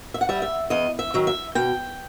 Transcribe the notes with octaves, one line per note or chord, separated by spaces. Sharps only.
E5
F#5
G3 E5
E5
E2 D#5
E5
D#3 F#3
E5
B2 G5